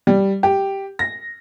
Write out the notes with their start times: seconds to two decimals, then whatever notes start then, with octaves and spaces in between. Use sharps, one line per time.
0.07 G3
0.43 G4
0.99 A#6